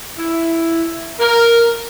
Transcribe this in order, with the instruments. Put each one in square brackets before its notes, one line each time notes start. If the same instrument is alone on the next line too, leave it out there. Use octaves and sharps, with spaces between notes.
[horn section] E4
A#4